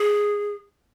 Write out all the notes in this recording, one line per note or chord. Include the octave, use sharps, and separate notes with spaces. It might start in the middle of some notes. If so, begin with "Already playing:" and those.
Already playing: G#4